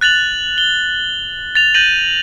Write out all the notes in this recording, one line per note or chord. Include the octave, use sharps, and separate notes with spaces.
F#6 A6 F7 F#7
G7
A6 F7
G6 A6 A#6 D#7 F#7